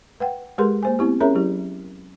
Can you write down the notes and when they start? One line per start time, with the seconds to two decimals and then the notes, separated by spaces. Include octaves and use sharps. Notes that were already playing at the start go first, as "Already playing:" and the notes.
0.20 B4 F#5 G5
0.58 G#3 G4 G#4 A#4 B4 C6
0.83 A#3 C5 G#5
0.99 B3 C4 E4 G4
1.20 C#4 G#4 A#4 C#5 E5 A#5
1.35 F#3 E4 G4